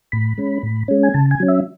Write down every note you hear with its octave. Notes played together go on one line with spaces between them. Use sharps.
A2 B5
G#3 C#4
A2
G#3 C#4
G#5
C#3 A5
G#5
F#3 C#4
E5